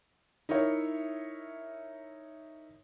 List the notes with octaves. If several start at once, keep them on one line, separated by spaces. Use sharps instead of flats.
D#4 E4 A#4 C#5 E5